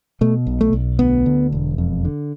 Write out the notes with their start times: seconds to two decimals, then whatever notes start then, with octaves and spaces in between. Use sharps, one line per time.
0.21 B2 A3
0.47 B1
0.61 A3
0.73 B1
0.99 D2 B3
1.26 D3
1.52 E1
1.78 F2
2.05 D3